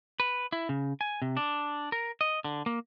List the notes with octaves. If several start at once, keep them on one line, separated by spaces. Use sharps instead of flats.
B4
E4
C#3
G#5
C3
D4
A#4
D#5
D3
A#3